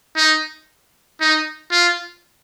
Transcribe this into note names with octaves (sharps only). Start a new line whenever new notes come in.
D#4
D#4
F4